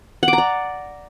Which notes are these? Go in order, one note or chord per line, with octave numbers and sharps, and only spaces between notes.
F#5
D6
A#5
D5